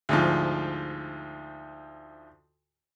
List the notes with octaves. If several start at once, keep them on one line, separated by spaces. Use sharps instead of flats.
D2 G#2 F3